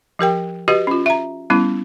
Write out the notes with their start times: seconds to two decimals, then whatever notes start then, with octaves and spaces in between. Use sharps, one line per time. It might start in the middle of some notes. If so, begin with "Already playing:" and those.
0.19 F3 G4 A#4 G5
0.68 F#4 G4 B4 D#5
0.87 C#4 F4
1.06 E5 A#5
1.50 G3 B3 C#4 E4